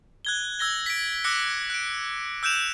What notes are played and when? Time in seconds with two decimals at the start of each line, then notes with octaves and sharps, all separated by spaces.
0.25 F#6 G#6 G7
0.59 E6 G#6 A#6 G7
0.86 B6 D7
1.24 D6 E6 F#6 A#6 C#7
1.70 F#6 D7
2.43 E6 F#6 G6 D7 E7 F7